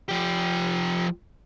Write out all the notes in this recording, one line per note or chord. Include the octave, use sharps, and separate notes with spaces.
F3 G4